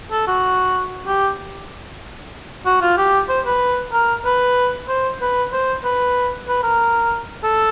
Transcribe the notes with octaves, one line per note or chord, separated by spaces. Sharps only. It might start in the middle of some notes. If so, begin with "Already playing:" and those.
A4
F#4
G4
F#4
F4
G4
C5
B4
A#4
B4
C5
B4
C5
B4
B4
A#4
A4